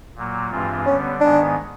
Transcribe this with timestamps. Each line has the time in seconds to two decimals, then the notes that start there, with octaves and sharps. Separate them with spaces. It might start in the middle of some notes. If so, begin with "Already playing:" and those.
0.16 A#2 F#3 A#3
0.51 G2 E3 G#3 C4 F4
0.85 D3 G3 B3 C#4
1.21 G#2 D#3 G#3 B3 D4